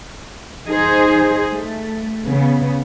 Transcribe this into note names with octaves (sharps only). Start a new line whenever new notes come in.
D#4 G#4 C5
A3
C#3 B3